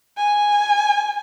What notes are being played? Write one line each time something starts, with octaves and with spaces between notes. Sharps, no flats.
G#5